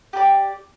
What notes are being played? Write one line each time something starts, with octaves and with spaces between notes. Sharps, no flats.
G4 B4 D5